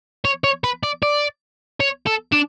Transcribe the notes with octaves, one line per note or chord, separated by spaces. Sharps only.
C#5
C#5
B4
D5
D5
C#5
A4
D4